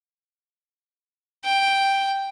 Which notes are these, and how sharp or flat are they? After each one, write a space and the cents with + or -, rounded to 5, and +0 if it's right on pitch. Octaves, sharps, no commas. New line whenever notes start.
G5 +0